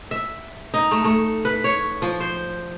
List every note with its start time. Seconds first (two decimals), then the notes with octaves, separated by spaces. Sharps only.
0.11 E5
0.74 D#4
0.91 A3
1.04 A3
1.45 B4
1.64 C#5
2.02 F3
2.20 C5